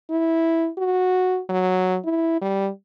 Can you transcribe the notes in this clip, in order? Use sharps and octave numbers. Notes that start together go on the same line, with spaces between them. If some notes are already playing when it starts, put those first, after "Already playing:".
E4
F#4
F#3
E4
G3